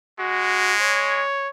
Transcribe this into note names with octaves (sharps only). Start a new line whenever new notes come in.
G#3 F#4
C#5